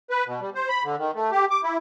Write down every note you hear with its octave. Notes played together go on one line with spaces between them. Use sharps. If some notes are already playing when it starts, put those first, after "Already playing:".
B4
B2
G3
C5
B5
D3
D#3
A3
G4
D6
E4